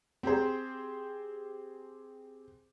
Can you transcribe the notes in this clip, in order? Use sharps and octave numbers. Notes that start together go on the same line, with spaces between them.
C4 G4 G#4 C5